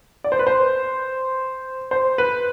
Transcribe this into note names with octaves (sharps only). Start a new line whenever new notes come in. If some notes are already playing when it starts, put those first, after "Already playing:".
D5
C5
B4
C5
C5
B4